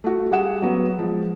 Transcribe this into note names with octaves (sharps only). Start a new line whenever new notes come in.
A3 F#4
G3 G#4 F#5 E7
F#3 B3
F3 G#3